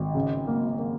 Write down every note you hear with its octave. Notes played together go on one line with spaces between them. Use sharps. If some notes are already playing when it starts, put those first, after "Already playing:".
Already playing: G#1
C#3
A#3
A#3